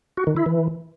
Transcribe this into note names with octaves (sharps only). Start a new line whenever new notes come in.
F#4
D#3
E4
E3